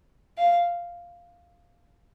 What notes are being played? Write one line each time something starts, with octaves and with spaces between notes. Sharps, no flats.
F5